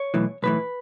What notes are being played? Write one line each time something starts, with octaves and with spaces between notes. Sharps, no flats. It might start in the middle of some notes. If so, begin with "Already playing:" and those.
Already playing: C#5
B1 A2 E3
B1 A2 E3 B4